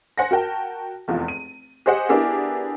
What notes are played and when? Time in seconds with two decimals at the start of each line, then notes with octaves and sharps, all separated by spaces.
0.18 C5 F#5 G#5 A#6
0.31 F#4 A#4 G5 A5
1.08 F1 E2 F4
1.28 D#7
1.86 G4 G#4 C5 D#5 F#5
2.09 B3 D4 E4 G4 G#4 A#4